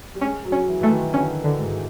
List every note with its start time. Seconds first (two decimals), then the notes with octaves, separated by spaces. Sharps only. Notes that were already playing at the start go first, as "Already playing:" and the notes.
0.15 G3
0.21 G#3 C#4
0.45 F#3
0.52 C#4
0.68 E3
0.81 E3 A3
0.91 D#3
1.14 D3 C#4
1.44 D3
1.59 G#2